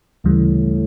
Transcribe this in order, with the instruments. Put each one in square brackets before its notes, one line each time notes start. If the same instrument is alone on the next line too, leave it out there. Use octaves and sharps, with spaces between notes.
[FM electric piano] D2 C#3 E3 G3 [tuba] A2